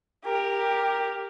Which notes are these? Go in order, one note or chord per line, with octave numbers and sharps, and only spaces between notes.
G4 A#4